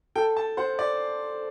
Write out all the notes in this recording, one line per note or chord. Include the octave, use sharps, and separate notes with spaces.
A4 G5
A5
C5 F#5
D5